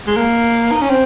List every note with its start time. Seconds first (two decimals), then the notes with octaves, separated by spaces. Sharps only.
0.07 G#3
0.17 A#3
0.72 D#4
0.81 C#4
0.90 C4